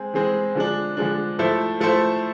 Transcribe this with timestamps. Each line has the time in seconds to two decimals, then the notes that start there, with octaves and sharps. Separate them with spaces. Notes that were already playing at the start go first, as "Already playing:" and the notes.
Already playing: G#3 C4 G#4
0.14 E3 G#3 C4 G#4
0.55 D3 F3 G#3 D4
0.97 D3 F3 G#3 D4
1.39 F3 A3 E4 A4 C5
1.80 F3 A3 E4 A4 C5